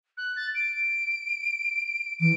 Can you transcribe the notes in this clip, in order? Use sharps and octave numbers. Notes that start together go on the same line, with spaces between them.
F#6
A6
D7
E3 D7